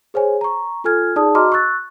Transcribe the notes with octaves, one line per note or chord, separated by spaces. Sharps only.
G#4 C5 C#5 G#5
A#5 C#6
F4 A4 G#5 F6 G#6
D#4 G#4 D5 A5 D#6
F#4 D#5 A#5 C6 D6 F6
C#6 E6 F#6 A6